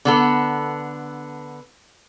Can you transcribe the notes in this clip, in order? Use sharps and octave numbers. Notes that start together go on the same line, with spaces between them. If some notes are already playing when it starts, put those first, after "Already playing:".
D3 B3 A4